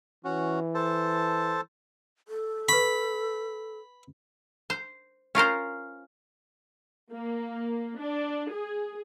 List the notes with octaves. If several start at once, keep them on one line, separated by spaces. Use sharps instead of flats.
E3 C#4 F#4
A4 C5 A5
A4
B4 B5 C#6
C5
C#4 F4 A#4 C5
A#3
D4
G#4